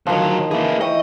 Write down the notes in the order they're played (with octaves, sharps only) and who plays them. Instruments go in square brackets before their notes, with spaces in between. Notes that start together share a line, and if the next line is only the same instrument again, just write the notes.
[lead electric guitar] D2 F#3 [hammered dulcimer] D#3 F3
[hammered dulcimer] E3 [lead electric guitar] A#3 G#4
[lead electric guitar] D#5 [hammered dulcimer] E5 G5 C#6